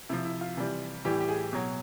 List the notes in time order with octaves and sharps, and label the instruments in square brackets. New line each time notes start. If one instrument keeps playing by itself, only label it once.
[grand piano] C3 F3 E4
E4
F4
C3 E3 G3
A2 E3 G3 G4
G4
G#4
B2 F#3